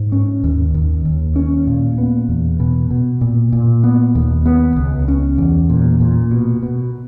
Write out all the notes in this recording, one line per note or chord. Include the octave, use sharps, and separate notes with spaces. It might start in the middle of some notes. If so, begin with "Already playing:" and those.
Already playing: G#2
C#4
D#2
D#2
D#2
C#4
A#2
B3
E2
B2
B2
A#2
A#2
B3
D#2
B3
C#2
C#4
E2
A#2
A#2
B2
B2